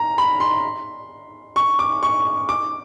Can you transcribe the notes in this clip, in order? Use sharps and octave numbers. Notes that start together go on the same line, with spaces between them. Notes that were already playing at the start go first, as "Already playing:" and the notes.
Already playing: A#5
B5
C6
C#6
D6
C#6
D6